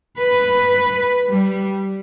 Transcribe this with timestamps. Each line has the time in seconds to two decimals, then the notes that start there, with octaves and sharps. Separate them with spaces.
0.20 B4
1.28 G3